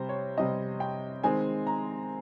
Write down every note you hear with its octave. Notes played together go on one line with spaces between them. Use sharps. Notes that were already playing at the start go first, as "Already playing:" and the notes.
Already playing: C3 G3 C4 C5
C#5
C3 G3 C4 D#5
G5
D#3 G#3 C4 G#5
A#5